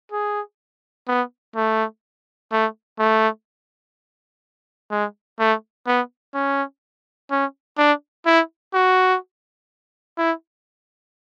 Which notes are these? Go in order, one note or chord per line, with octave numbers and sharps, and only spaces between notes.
G#4
B3
A3
A3
A3
G#3
A3
B3
C#4
C#4
D4
E4
F#4
E4